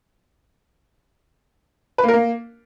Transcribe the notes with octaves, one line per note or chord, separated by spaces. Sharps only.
B4
A#3
A#4
A#3